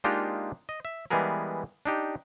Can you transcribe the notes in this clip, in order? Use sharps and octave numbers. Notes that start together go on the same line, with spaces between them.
G#3 A#3 D4 D#4 F4 G4
D#5
E5
E3 G3 G#3 B3 G#4 A#4
D4 D#4 G4